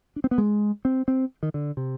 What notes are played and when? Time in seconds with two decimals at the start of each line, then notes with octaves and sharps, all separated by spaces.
0.16 D4
0.24 C4
0.31 B3
0.38 G#3
0.85 C4
1.08 C4
1.43 D#3
1.54 D3
1.77 C3